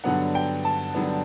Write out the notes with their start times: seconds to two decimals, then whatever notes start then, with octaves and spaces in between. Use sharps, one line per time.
0.04 G2 D3 F#3 B3 F#5
0.35 G5
0.65 A5
0.94 G2 D3 F#3 B3